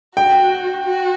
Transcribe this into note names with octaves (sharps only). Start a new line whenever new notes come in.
F#4 G5
F#4